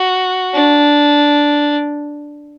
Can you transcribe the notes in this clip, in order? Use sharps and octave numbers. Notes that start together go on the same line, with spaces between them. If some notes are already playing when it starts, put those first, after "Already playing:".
Already playing: F#4
D4